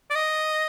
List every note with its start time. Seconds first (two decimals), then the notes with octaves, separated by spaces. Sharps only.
0.10 D5
0.15 D#5